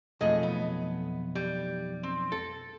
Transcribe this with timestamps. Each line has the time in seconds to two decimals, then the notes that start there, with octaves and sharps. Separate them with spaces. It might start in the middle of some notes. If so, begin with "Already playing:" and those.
0.21 B1 F2 A3 G#4 D#5
0.43 B3
1.35 G3
2.03 C4
2.32 A4